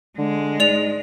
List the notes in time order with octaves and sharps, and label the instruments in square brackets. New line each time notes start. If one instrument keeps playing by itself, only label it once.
[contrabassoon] D3 [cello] G#3
[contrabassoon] G#2 [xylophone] D5 F7